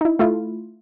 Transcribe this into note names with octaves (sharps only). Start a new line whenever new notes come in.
D#4 E4
A3 E4 F4